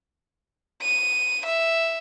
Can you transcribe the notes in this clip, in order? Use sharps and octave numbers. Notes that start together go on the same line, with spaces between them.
D#7
E5